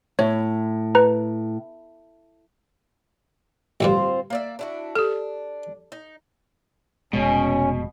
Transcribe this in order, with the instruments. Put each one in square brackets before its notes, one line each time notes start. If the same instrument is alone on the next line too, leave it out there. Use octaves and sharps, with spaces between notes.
[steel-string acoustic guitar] A2 [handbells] C#5
[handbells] B4 A#5
[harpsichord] A1 D2 G2 [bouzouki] C4 F4 C5
[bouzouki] A#3 D5 E5
D4 E4 F#4
[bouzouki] D4 [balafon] G4 A4
[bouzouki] D#4
[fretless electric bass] F1 G#3 [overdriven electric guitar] B2 [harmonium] C#4